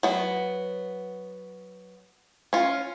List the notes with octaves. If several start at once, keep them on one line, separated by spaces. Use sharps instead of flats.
F#3 B3
C#4 F4